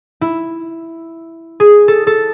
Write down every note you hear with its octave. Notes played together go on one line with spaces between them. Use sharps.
E4
G#4
A4
A4